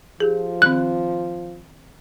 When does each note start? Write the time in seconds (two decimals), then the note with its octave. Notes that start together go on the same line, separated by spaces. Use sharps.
0.20 F3 F4 G4 G#4
0.62 D#3 C4 F#6